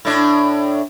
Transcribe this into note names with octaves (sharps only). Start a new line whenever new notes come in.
A2 D4